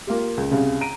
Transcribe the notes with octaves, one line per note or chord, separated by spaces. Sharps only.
A#3 F4 G4
C#2
C2 C#3
A#5 D7 D#7